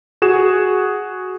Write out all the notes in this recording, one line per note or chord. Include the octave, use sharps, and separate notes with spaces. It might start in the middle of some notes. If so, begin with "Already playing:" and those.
F#4 G#4 E7